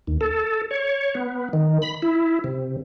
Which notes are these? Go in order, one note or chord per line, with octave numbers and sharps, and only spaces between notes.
D#2
A4
C#5
B3
D#3
B5
E4
C3